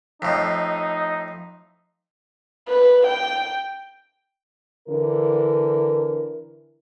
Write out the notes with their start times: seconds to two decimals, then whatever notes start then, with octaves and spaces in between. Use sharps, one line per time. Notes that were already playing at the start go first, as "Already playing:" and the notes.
0.22 F2 A2 D#4
2.68 B4
3.07 G5
4.88 D3 E3 A#4